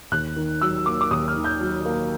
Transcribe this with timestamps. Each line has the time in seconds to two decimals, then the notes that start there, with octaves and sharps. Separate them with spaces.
0.11 D#2 F#6
0.36 D#3
0.61 F#3 E6
0.86 A#3 D6
1.01 D6
1.11 D#2 D#6
1.28 F6
1.36 D#3
1.44 G6
1.60 F#3
1.86 A#3